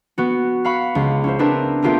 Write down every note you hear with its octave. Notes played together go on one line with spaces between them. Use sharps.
B3 F#4
F5 F#5 B5 C#6
C#2
C#4 E4 C5
B3 C4 D4 E4 A#4 B4
A3 B3 F4 G4 G#4 A#4